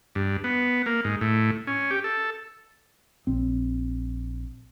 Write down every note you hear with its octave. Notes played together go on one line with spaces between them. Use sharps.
G2
B3
A#3
G#2
A2
C#4
G4
A4
A#1 C4